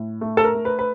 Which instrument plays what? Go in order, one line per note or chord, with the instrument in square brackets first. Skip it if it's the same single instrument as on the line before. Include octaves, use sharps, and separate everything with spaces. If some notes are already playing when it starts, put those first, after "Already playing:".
Already playing: [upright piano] A2
A3
A4
A#4
A3
B4
B4